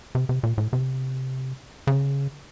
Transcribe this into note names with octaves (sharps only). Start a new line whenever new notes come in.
C3
C3
A#2
A2
C3
C#3